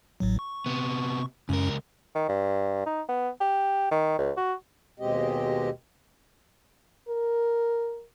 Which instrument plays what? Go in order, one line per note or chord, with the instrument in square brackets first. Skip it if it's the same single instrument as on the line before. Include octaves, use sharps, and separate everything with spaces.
[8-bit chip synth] A1 A2 F#3
C#6
[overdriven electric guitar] C3 B3
[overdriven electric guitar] C#2 A#4 [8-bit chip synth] F#2 C#4
[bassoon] D#3
G2
D#4
B3
G4
D#3
C#2
F#4
[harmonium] D#2 B2 G#3 C4 G4 D#5
[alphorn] A#4